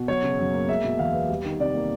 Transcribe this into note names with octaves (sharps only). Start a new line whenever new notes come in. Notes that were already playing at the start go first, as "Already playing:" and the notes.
Already playing: B2
F#3 C#5
C#3
F#2
A#3
G#3 E5
B2
E2 F5
B3
G3
D#3
C3 D5
A#3